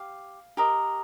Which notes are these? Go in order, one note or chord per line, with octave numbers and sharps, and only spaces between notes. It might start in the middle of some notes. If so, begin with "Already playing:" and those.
Already playing: G4 F5
G4 A#4 D#5